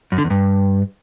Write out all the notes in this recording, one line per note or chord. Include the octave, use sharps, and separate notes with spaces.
F#2
D3
E2
G2